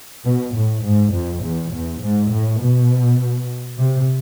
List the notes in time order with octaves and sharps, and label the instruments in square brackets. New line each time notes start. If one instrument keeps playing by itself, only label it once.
[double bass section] B2
A2
G#2
F2
E2
E2
G#2
A2
B2
C3